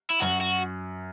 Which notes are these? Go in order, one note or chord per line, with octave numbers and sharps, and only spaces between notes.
E4
F#2 F#4
F#4